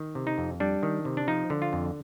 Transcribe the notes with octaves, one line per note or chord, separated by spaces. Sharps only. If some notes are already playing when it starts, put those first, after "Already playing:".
Already playing: D#3
C3
D#4
F2
G3 D4
D#3
C3
D4
F3 D#4
D3
F4
F2